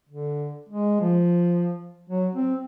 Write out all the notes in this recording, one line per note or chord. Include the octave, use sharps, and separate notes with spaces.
D3
G#3
F3
F#3
C4